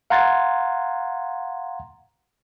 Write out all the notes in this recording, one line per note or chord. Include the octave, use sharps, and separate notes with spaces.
F5 F#5 A#5 C6 G#6 A6